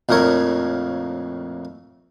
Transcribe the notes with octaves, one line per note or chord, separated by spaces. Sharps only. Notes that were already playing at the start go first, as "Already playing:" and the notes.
A#1 F2 A2 A#4 C#5